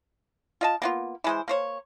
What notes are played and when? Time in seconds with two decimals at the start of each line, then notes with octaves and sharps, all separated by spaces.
0.61 F4 D#5 A5
0.82 A#3 B3 F4
1.24 E3 G#3 C5
1.48 A#3 C5 C#5